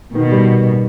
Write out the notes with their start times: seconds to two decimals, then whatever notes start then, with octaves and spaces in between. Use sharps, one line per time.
0.15 B2 D#3
0.32 G3